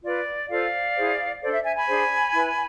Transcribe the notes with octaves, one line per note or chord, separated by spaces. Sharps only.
F4 B4 D5
F4 A4 C5 D5 F5
E4 G#4 C5
D4 A4 C5 D5
E5
E5 G#5
G#5 B5
D4 G#4 C5
E4 B4